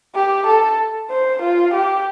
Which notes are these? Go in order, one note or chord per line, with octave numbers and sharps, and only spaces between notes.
G4
A4
C5
F4
G4